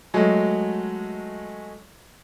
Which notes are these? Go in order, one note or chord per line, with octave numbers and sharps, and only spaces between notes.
F#3 G#3 A3